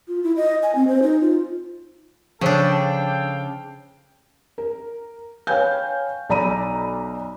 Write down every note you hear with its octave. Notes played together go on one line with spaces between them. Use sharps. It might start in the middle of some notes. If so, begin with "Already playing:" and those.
F4
E4
D#5
G#5
C4
C5
D#4
F4
C#3 F3 D4 A4 C5 F5 G5 E6
A#4
B4 C#5 F5 G5 G#5 G6
B1 D5 A#5 B5 D#7